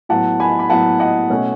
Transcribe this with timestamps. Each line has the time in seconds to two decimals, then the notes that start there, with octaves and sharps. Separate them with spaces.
0.09 A2 F#3 B3 F#5 A5
0.40 G#5 B5
0.59 B5
0.70 A2 F#3 B3 F#5 A5
1.00 D#5 F#5
1.30 B2 A3 C#4